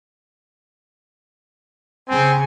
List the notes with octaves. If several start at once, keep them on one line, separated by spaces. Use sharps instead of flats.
C#3 C4 G#5